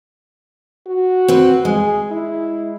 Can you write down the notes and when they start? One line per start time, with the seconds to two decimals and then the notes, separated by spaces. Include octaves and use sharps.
0.87 F#4
1.28 C4 B4
1.65 G#3 G#4
2.11 E4